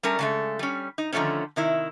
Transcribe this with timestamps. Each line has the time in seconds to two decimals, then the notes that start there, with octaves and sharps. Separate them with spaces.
0.03 G3 A3 C#4 A#4 A5
0.19 C#3 G#3 A3
0.59 G3 C#4
0.98 D#4
1.13 D3 D#3 F3 A3 B3 C#4
1.56 C3 D#3 E4